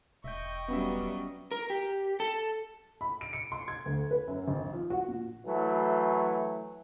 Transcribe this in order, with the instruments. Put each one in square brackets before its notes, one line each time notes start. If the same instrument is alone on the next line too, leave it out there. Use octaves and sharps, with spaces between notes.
[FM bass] E1 [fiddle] D#5 C#6 [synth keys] E5 G5
[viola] F#3 G3 [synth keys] B3 C#4 E5
[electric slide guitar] A#4
G4
A4
[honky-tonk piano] B5
D7
C#7
C6
G#6
D2
B4
F#2
G#1
F3
F#4
A#2
[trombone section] E3 F#3 A3